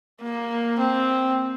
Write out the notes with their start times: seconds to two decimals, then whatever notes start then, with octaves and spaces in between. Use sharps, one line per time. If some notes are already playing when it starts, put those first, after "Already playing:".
0.22 A#3
0.79 C4